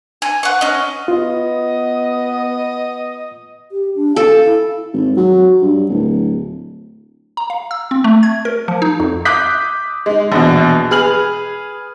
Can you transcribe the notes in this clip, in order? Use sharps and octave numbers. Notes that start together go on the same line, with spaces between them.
G#5
F#5 C#6
C#4 D#5
B3 F4 D#5
G4
D4
A4 F5
E4
G#1
F#3
G2
D1
A#5
F5
E6
C4
A3
G#6
A#4
F3
D#4
F2
D6 D#6 F#6 G6 B6
G#3 D#4
A#1 E2 B2
G#4 B4 F6 F#7